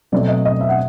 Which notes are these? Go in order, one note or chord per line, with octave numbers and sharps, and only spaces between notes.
B2 F#3 A3 C4 D5
D#5
D#5
E5
F#5